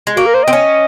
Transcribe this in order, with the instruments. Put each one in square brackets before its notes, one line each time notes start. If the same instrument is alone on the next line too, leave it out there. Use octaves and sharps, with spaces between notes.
[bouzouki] G#3
[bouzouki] A#3 [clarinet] F#4
[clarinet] A#4
C5
[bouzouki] C4 [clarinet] D#5
[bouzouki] C#4